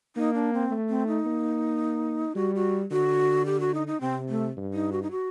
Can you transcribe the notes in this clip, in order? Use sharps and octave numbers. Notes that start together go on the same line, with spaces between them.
A#3 D#4
D4
C4
A3
C4
D#4
A#3
G3 F#4
F#4
D3 F#4
G4
F#4
D#4
D#4
C3 C4
A3
G2
D#4
F#4
D#4
F#4